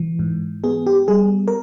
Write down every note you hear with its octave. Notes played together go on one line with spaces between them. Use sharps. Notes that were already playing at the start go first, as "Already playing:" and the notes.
Already playing: E3
G#2
B3 G#4
G4
G3 G#4
A#4